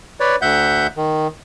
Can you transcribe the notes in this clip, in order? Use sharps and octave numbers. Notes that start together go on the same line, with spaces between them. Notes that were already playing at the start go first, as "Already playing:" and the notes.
B4 C#5 D5
D2 E5 F#5 G6
D#3